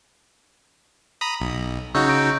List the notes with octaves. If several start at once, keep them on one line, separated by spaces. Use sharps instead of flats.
A#5 B5 D#6
B1
C#3 D#4 F#4 C#6 E6 G6
D7